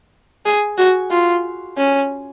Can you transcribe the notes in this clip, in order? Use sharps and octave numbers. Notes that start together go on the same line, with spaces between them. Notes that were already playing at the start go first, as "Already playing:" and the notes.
G#4
F#4
F4
C#4